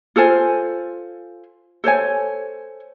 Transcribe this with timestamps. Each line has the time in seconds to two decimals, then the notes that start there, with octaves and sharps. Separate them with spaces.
0.16 F4 A4 C5 G#5
1.84 A4 C5 C#5 G#5